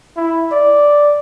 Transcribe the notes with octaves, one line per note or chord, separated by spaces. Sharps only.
E4
D5